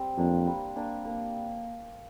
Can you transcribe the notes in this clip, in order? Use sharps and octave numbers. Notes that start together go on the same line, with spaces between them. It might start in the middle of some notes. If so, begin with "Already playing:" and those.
Already playing: G3 C4
F2 A#3 D4
G3
A#3 D4
A#3